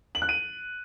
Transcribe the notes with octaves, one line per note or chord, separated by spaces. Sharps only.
F#7
F#6
D#7